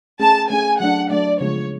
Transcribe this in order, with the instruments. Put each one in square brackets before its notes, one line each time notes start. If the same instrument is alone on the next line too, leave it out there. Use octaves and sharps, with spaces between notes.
[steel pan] A3 C#4 G#4 [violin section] A5
[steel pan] A3 C#4 G#4 [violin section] G#5
[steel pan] F#3 A3 D4 [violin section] F#5
[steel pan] F#3 A3 D4 [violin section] D5
[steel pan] C#3 F3 G#3 B3 F4 [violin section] C#5